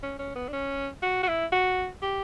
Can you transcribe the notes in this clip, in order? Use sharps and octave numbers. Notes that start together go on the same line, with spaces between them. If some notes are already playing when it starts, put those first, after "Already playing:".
C#4
C#4
B3
D4
C#4
F#4
F#4
E4
F#4
G4